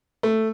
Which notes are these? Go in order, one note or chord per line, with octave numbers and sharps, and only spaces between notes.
A3